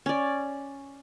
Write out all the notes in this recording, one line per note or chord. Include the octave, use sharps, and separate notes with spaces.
C#4 D5